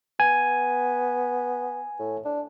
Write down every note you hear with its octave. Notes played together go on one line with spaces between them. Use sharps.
B3 G#5
A2
D4